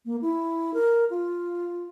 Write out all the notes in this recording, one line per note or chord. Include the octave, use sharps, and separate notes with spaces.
A#3
E4
A#4
F4